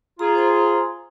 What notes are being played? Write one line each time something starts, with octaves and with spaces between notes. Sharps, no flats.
F4 G#4 A#5
C5 G#5 A#5